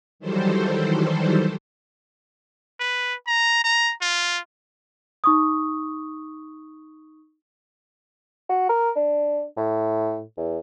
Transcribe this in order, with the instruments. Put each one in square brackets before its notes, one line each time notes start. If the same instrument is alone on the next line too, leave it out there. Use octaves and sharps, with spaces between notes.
[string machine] D#3 E3 F#3 G3 A4 C5
[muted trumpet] B4
A#5
A#5
F4
[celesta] D#4 C#6 D#6
[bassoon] F#4
A#4
D4
A2
E2